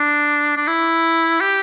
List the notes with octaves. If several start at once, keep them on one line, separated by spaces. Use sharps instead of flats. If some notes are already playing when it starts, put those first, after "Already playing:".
Already playing: D4
D4
E4
G4